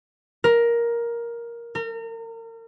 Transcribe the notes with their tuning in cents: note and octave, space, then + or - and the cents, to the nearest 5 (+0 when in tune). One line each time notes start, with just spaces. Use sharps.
A#4 +10
A#4 -35